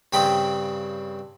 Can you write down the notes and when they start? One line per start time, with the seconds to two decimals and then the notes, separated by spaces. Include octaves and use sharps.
0.13 G2 C#3 C4 G5 B5 D#6